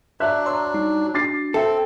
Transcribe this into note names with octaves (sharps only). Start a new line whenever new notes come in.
F#3 D4 E5 F#6
C#5 A#5 C6 E6
G3 D#4
D4 F#4 D6 A6 C7
C4 A4 E5